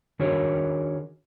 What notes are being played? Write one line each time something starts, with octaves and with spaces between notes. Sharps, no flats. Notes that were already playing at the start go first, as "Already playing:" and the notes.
D#3 D4 F#4 G#4 A#4 C#5